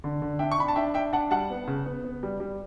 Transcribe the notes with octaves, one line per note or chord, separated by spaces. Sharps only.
D3
D3
D4 E5 G5
C#6
D4 B5
A5
D4 E5 G5
D4 E5 G5
D4 F#5 A5
G3 F#5 A5
B3
C#3
B3
B3
G3
G3